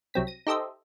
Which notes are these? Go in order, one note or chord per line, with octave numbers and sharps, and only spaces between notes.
C2 F#3 C4 B6
A#6 D#7
D#4 G4 A4 C5 D#5 E5